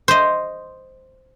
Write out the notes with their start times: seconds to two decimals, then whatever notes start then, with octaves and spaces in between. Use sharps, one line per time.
0.08 C5 D#5